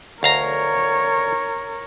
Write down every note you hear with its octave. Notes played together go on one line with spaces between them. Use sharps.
D2 A#4 C#5 F5 A#5